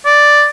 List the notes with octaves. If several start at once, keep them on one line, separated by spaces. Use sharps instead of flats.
D5